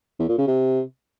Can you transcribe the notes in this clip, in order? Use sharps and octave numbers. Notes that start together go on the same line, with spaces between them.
E2
A#2
C#3
C3